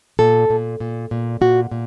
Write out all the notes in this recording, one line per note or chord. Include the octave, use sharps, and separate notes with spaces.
A#2 A4
A#2
A#2
A#2
A#2 F#4
A#2